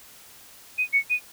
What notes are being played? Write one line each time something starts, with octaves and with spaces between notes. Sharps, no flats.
D#7
C#7
D#7